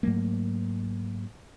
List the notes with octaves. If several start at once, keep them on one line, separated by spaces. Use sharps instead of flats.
G#2 F#3 A3 A#3